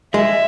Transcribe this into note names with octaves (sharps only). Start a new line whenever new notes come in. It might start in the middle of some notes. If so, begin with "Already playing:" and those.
G#3 E5